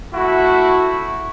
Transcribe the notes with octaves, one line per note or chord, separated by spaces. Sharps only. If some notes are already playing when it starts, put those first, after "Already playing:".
A3 E4 F#4